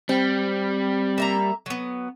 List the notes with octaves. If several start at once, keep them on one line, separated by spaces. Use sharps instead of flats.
G3 C4 G5
A#3 E5 A#5
F#3 B3